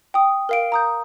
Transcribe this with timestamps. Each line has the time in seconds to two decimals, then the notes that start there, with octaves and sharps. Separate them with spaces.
0.14 G5 D#6
0.49 A#4 F5 D7
0.72 A#5 D#6 G6